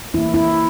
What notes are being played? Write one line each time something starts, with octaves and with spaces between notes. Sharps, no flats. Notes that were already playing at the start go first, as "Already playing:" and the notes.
E3 A#3 E4
E4